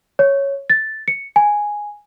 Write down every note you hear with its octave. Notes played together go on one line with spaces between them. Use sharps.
C#5
A6
C#7
G#5